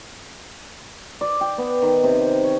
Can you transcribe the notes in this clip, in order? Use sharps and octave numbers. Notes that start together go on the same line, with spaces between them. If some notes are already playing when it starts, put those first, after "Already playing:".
D5
G5
B3
D#3
C3
G4
C#5